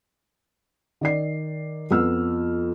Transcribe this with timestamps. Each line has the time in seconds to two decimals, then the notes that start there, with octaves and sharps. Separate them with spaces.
1.01 D#3 D5 C7
1.91 F2 B3 E6 F6